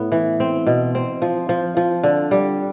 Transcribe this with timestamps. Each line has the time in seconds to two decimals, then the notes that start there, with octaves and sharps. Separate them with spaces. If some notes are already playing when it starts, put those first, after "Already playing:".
Already playing: A2 B3
0.12 E3
0.40 C4
0.67 B2
0.95 C4
1.22 F3
1.49 F3
1.77 F3
2.03 D3
2.31 G3